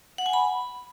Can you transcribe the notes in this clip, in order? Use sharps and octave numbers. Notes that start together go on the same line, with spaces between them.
F#5
G#5
B5